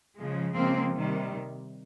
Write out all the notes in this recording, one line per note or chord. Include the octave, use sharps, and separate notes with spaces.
C#3 F3 G#3
C#3 F3 G#3 A#3 C4
C3 D#3 G3